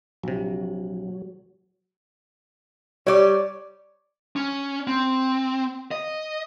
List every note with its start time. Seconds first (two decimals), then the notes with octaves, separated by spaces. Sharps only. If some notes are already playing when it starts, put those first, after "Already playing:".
0.23 A#1 C3 F#3
3.07 G3 C#5 D5
4.36 C#4
4.87 C4
5.91 D#5